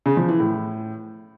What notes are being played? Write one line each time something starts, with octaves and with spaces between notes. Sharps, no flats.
C#3
F3
E3
A2